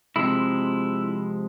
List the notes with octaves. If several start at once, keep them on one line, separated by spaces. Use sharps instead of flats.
C3 F3 G#3 E4